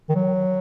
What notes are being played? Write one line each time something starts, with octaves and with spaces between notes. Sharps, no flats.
D#3
F#3